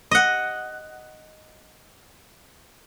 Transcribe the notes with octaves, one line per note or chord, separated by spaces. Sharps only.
D#5 F#5